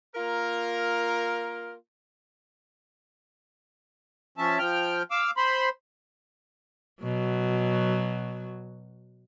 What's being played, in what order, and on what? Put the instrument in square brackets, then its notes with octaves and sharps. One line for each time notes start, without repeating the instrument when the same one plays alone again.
[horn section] A#3 F4 A#4
[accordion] F3 C#4 E5 A5
F3 G5 F6
F5 D6 E6
C5 B5 C6
[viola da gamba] B2 F#3